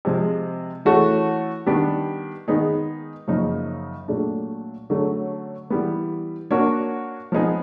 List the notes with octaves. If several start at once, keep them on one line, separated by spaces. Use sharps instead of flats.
C3 F3 G#3
E3 A3 C#4 F#4 A4
D#3 G3 B3 D4 G4
D#3 G#3 B3 D#4 G#4
F#2 C#3 F3 A#3 D#4
A#2 F#3 A3 D4
D3 F#3 A3 C#4
E3 G3 B3
A#3 D4 F#4 A#4 C#5
F3 G#3 B3 D#4 G#4